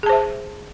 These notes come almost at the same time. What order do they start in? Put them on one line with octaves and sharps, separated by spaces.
G#4 A5 C5 E5